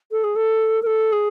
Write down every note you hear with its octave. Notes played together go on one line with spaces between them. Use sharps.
A4
G#4
A4
A#4
A4
G#4